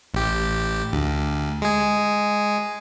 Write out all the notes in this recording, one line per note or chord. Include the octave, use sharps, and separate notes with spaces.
A1 G4
D2
G#3 G#4